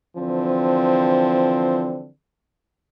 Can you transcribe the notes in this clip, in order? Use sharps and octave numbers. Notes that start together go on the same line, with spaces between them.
D3 E3 F3 C4